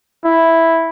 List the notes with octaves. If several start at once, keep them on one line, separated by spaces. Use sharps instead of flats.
E4